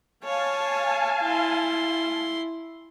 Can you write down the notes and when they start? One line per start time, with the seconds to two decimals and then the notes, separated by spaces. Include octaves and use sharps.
0.24 C#5 F5 G#5 A5
1.22 E4 C6